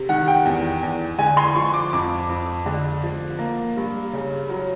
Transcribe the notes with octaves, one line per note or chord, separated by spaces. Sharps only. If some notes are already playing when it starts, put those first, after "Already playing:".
Already playing: C3
D#3 F#5
G5
E2
E2
D3 G#5
C6
F3 C#6
D6
F2 D6
F2
D3
F3
A#3
G2
C#3
F#3